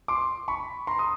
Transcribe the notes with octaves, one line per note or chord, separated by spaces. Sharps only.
C6 D6
B5 C#6
A#5 C6
D#6